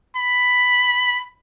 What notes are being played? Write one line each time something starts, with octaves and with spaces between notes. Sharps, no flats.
B5